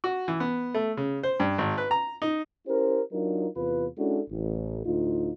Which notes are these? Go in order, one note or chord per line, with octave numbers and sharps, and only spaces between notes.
F#4
E3
B3
A3
C#3
C5
G2
G#1
B4
A#5
D#4
C#4 E4 G4 A#4 C5
F#3 D4 D#4 F4 A#4
E2 C3 F4 B4
G#3 C#4 D4 E4 F#4 A4
A1
D2 A2 D#4 F4